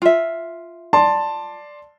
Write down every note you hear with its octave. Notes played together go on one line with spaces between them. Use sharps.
F4 E5
D5 A5 C6